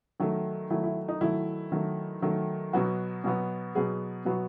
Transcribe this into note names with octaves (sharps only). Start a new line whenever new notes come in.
D#3 F#3 A3
D#3 F#3 A3 E4
E4
D#4
D#3 F#3 A3 E4
D#3 F#3 A3
D#3 F#3 A3
B2 F#3 B3 F#4
B2 F#3 B3
B2 F#3 B3 G#4
B2 F#3 B3 F#4